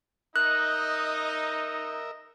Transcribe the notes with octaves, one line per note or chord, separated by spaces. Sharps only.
D#4 A#4 D#5 E5 F#6